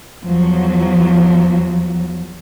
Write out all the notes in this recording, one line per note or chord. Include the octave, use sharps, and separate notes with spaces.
E2 F3 F#3